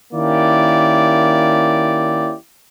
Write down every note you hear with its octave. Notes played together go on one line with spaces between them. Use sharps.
D#3 A#3 C#4 E4 G4 D5